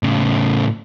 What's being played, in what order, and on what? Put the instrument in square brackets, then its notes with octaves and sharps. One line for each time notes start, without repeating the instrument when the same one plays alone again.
[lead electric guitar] A2 C#3